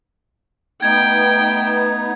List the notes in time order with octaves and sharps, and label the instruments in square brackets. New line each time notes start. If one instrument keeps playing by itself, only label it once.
[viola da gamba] A3 [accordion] B3 D#4 [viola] G5 [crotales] G#6